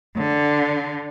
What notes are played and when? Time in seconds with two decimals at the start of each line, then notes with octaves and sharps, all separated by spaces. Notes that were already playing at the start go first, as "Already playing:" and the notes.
0.16 D3